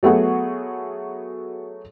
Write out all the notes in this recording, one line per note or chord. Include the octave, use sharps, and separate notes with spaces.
F#3 A3 B3 F#4 G#4